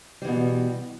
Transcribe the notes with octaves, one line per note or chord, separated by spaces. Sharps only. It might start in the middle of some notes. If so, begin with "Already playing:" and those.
B2 E3 G3